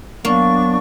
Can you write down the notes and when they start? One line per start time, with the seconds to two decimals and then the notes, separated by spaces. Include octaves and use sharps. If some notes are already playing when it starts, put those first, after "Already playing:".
0.25 F#3 A#3 B3 D4 C#6